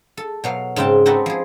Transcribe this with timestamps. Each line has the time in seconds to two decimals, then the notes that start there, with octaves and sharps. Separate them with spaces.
0.17 A4
0.44 B2 F#3 F5
0.76 G#2 C#3 C4 G5 A5
1.06 C4 D#4 F#4 A4 B4
1.26 F3 G#4